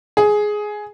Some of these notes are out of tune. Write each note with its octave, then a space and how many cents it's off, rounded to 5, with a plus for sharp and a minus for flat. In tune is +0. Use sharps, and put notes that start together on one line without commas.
G#4 +10